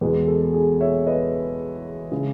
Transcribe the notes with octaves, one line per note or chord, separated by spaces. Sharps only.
E2 B2 G#3 G#4 B4
A4
G#4
C#5 E5
B4 D#5
C#3 G#3